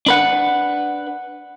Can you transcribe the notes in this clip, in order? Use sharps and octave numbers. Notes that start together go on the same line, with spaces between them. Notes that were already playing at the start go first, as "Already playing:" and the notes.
D4 B4 F#5